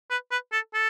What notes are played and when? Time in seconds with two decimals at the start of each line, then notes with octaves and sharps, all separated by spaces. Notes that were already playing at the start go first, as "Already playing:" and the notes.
0.10 B4
0.31 B4
0.53 A4
0.74 A4